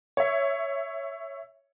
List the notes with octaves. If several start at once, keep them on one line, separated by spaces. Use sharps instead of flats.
C#5 E5